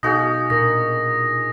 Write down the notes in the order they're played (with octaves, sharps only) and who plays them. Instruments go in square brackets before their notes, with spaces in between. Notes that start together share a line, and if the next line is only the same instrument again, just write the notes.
[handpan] B2 A4 F5 [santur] D#4 F#4 G#4 [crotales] D#6 A#6
[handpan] A#2 D4 A#4 [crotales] A#6